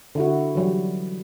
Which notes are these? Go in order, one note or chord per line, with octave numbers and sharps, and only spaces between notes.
D3 E4 F#4
E3 F#3 G3